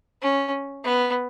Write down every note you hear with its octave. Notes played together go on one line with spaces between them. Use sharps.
C#4
B3